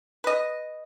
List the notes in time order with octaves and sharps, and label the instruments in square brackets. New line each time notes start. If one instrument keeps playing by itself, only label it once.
[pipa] B4 D#5